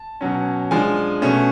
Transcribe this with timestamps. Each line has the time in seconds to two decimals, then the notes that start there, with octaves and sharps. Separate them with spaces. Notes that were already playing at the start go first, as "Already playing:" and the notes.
Already playing: A5
0.21 B2 F#3 C#4
0.71 F3 G#3 D4 G#5
1.22 B2 A3 C#4